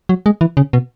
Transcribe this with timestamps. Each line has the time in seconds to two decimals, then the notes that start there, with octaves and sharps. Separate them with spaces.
0.09 F#3
0.26 G#3
0.41 E3
0.57 C#3
0.73 B2